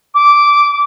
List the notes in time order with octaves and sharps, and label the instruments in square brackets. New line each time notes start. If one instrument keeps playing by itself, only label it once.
[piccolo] D6